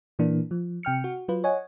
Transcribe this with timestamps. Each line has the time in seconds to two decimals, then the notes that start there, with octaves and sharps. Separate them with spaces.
0.19 A#2 E3 A#3 D4
0.51 F3
0.83 C3 G5 F6 C#7
1.04 F#4
1.28 F#3 F4 B4
1.44 C#5 D#5 F#5 G#5